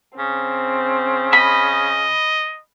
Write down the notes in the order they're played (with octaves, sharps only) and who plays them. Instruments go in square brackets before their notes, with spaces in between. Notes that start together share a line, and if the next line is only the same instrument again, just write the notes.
[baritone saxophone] C#3 [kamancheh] C4
[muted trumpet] D#5 [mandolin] B5